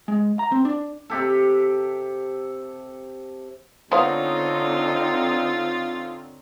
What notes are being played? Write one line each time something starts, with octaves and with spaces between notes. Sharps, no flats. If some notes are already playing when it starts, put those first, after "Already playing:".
G#3
A#5
C4
D4
C3 G4 A4
D3 B3 C4 D#4 F4 C5 C#5 F5